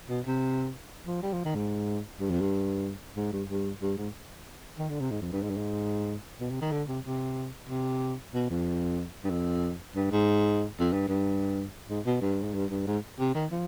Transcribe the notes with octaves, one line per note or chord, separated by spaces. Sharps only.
B2
C3
F3
G3
F3
D#3
G#2
G2
F2
G2
G#2
G2
G2
G2
G#2
D#3
D3
C3
G#2
F2
G2
G#2
G2
G#2
B2
C3
D#3
D3
C3
C3
C3
B2
F2
G2
F2
G2
G#2
F2
G2
G2
G#2
B2
G2
G#2
G2
G2
G#2
C3
D#3
F3